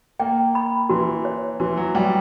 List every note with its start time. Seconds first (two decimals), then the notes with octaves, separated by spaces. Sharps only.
0.20 A#3 G5
0.55 B5
0.89 E3 F#4
1.25 C#5
1.60 E3 F#4
1.77 F#3
1.95 G3 G5